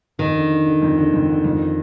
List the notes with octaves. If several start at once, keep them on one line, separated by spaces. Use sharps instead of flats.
F2 D#3
D3
D3
D3
F2
D3
F2
D3
F2